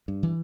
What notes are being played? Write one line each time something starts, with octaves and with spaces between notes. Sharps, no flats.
G2
E3